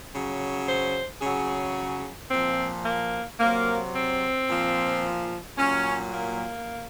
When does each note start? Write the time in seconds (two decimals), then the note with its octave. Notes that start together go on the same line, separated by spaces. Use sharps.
0.13 C#3 F#3
0.68 C5
1.21 C#3 F#3 G#4
2.30 A#2 F3 C4
2.85 A#3
3.40 C3 F#3 A#3
3.95 C4
4.49 A#2 F3
5.58 A#2 F#3 C#4
6.13 A#3